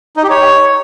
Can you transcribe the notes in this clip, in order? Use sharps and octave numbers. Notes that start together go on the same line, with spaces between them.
D#4
G4
C#5